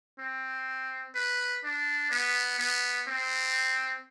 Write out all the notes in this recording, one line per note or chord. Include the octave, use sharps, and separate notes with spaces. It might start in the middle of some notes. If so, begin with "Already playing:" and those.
C4
B4
D4
B3
B3
C4